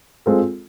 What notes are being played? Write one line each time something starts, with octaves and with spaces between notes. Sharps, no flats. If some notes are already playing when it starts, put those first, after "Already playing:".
G#3 C4 F4 A4